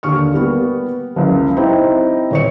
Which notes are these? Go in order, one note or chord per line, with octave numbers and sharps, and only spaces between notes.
D#2 D3 C#6 F6
G3 A#3 B3
F#1 C#2
C4 D#4 E4 G4 C5
D#1 C#5 C#7